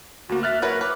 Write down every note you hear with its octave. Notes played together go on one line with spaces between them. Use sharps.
D2 A#3 F#4
E5 F6 F#6 A6
F#3 A#4 B4 C#5 F#6
B4 D6